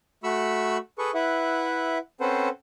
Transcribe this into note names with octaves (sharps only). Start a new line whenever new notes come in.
A3 F#4 B5 C#6 E6
G#4 A4 B4 C#6
E4 B4 E5 F#5
C4 C#4 A4 B4 C5 F#5